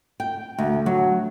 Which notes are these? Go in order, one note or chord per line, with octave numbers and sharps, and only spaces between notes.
G5
D2
F#3